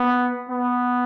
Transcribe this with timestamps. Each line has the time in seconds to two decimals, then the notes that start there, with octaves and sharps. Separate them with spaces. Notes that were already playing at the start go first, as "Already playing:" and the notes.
Already playing: B3
0.49 B3